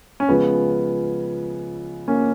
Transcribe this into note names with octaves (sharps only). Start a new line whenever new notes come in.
C#4
C#2 C#3 F3 B3
A#3 C#4